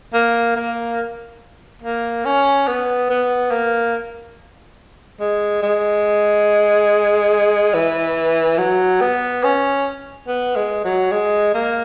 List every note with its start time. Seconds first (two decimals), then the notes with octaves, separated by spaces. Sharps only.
0.14 A#3
0.56 A#3
1.82 A#3
2.25 C#4
2.67 B3
3.10 B3
3.51 A#3
5.20 G#3
5.63 G#3
7.74 E3
8.58 F#3
9.01 B3
9.44 C#4
10.27 B3
10.56 G#3
10.85 F#3
11.12 G#3
11.54 A#3